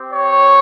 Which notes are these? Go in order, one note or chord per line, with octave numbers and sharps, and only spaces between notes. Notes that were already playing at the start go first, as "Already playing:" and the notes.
Already playing: C4 G4
C#5